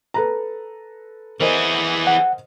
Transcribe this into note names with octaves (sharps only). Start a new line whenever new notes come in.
A4 B4 A#5
E3 G#4 A#4 C5 D#5
F#5